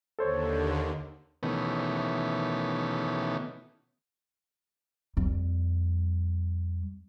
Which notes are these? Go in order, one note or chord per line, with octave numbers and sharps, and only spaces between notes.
D#2 D3 A4 C5 C#5
B2 D#3 E3 A3 B3 C#4
F2 G3